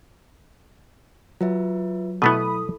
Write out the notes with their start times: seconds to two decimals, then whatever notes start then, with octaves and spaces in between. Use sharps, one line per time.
1.41 F#3 F4 B4 E5
2.22 B2 A3 B3 E4 A4 B5 D#6